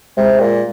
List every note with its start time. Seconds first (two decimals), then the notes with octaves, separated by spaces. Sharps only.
0.17 C3 G#3
0.40 A#2